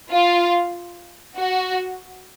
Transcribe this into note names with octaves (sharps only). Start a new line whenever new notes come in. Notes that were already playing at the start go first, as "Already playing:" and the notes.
F4
F#4